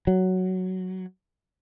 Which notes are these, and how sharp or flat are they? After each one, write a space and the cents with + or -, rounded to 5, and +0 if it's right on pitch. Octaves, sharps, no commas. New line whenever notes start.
F#3 +5